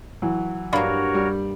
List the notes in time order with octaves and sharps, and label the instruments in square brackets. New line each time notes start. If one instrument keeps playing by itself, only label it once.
[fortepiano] E3 F#3
[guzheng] G2 A#3 [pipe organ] F#4 A#4 C#5 [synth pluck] D5 F5 B5
[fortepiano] G3